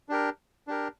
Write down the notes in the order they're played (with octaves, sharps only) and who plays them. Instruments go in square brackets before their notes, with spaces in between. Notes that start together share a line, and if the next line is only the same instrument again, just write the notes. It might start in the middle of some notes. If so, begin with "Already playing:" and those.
[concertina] D4 G4 A#4
D4 G4 A#4